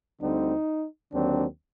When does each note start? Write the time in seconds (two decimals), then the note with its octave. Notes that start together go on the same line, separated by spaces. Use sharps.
0.21 D2 D3 G3 C4 D#4
1.12 D#2 D3 F#3 C4 D4